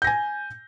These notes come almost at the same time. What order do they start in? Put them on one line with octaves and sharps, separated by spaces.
G6 A#6 G#5